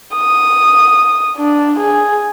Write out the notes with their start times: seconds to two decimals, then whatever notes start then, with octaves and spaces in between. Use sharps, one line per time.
0.16 D#6
1.37 D4
1.79 G#4